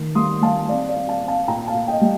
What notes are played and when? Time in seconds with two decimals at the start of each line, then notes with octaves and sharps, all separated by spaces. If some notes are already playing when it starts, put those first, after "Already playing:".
Already playing: D#3
0.15 G3 C6 D#6
0.42 G3 F5 A5
0.68 C4 D5 F5
0.89 D5 F5
0.95 C4
1.08 F5 A5
1.21 C4
1.28 F5 A5
1.48 A#2 G5 A#5
1.68 F5 A5
1.74 A#2
1.87 D#5 G5
2.01 G3